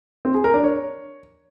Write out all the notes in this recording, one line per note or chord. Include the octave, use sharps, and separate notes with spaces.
C4
G#4
A#4
D4
C#5